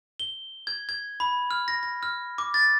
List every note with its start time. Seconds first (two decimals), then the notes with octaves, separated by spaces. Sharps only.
0.20 G7
0.67 G#6
0.89 G#6
1.20 B5
1.51 F6
1.68 A#6
1.83 A#6
2.03 F6
2.38 D6
2.54 A6